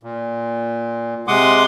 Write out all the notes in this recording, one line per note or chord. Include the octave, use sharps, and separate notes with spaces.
A#2
C3 G#3 F#5 C6 D6 D#6